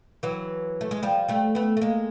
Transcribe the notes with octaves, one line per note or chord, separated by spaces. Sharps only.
E3 F#3
A3
G#3
F3 G3
G3 A3
A3 B3
A3
G#3 A#3